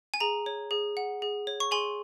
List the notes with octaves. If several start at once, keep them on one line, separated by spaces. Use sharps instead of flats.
G#5
G#4 A#5
C#5
G#4
F#5
G#4
C#5
C#6
G#4 G#5 C6